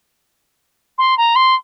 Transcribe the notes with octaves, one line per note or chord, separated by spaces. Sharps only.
C6
A#5
C6